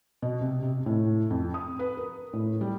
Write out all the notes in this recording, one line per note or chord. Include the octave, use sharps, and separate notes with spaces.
B2
C3
C3
A2
F2
D#6
B4
A#4
A2
G3